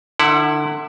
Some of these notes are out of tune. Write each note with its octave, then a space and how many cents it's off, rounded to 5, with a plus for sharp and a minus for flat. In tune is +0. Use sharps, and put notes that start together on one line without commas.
D3 +30 E4 +0 F#5 +0